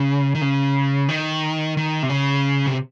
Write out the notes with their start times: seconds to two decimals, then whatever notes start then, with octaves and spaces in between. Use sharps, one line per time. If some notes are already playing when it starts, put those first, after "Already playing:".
Already playing: C#3
0.35 D#3
0.42 C#3
1.09 D#3
1.77 D#3
2.03 C3
2.10 C#3
2.67 C3